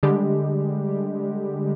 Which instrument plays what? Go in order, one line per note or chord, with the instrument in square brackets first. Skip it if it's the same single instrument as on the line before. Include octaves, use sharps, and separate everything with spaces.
[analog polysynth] D3 G3 G#3 G4